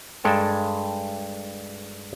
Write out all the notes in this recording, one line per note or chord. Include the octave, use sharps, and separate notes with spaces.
G2 G#3 A4 G5 A5